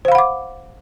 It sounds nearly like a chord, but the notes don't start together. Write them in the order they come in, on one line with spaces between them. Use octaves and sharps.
C5 F5 B5 F#5 D6